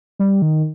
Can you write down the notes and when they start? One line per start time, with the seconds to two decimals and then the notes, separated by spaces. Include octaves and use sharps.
0.19 G3
0.42 D#3